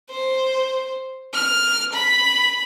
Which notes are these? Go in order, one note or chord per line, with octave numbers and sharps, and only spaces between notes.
C5
F6
B5